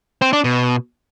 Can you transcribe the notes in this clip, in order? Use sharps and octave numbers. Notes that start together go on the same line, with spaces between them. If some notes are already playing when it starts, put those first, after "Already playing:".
C4
D4
B2